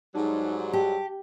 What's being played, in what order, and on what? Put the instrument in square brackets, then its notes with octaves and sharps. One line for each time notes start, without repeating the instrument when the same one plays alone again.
[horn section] G#2 F#3 G3 [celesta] D#4 A5
[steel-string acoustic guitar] G4 [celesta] A5